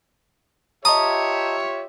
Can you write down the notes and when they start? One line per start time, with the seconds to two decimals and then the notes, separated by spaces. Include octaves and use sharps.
0.85 F4 G4 C#5 D#5 E5 A5 A#5 D#6